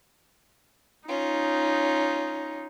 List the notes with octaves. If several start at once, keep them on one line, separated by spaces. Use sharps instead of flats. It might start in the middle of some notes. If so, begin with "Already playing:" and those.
C#4 D#4 F4